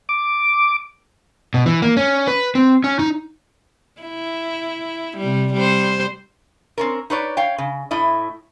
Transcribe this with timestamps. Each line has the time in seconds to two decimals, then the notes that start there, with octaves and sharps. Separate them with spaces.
0.09 D6
1.54 B2
1.66 E3
1.82 A#3
1.97 C#4
2.27 B4
2.55 C4
2.84 C#4
2.99 D#4
4.01 E4
5.17 C3 G3
5.54 G3 C5
6.78 C4 C#4 A#4
7.10 D#4 B4 C#5 D5
7.37 C#5 F5 G5
7.58 C#3
7.91 A2 E4 D#5